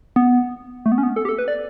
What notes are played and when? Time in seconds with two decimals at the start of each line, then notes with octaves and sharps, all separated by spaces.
0.16 B3
0.86 A3
0.92 B3
0.98 C#4
1.03 B3
1.16 A4
1.25 G4
1.29 A4
1.39 B4
1.48 D5